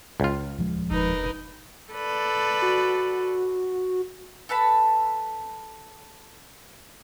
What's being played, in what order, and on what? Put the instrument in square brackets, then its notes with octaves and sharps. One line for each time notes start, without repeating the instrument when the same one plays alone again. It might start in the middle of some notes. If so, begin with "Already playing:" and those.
[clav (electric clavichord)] C#2 F4
[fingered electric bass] D#1 F3 G#3
[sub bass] F1 [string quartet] D#4 A#4 B4
[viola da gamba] A4 B4 D5
[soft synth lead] F#4
[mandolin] A4 B4 A5 B5